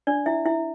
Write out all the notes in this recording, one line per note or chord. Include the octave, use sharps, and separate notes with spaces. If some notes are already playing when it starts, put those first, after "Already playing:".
D4 D5
E4 E5
E4 E5